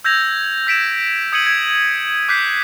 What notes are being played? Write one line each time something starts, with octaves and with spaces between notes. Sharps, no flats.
E6 G6 G#6 A#6 F7
E6 B6 D7 E7
D#6 G#6 C#7 D#7 F#7
G#6
D6 F#6 G6 B6 C7